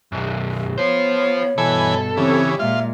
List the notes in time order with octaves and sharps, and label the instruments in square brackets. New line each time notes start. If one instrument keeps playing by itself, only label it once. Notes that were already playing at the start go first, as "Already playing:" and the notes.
[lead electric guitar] B1 F#2
[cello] B3 [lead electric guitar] F4 C5 [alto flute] C#5
[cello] G2 B2 [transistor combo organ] E3 G#5 B5 [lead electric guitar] A4
[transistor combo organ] C#3 E3 [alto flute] C4 [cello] G4 C#5
[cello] A#2 G#3 [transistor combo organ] F4 [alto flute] E5